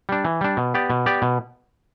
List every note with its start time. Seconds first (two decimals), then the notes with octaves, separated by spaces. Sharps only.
0.09 G3 D4
0.24 E3
0.41 G3 D4
0.57 B2
0.74 B3 G4 D5
0.90 B2
1.06 B3 G4 D5
1.22 B2